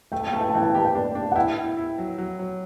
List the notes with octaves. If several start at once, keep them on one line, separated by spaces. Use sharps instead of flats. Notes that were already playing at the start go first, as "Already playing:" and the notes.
A3 G5
A5
G5
A3 A5
G5
A5
E3 G5
A5
G5
G4 A5
G5
D4
D4
F#5
E4 G5
E4
E4
F#3
F#3
F#3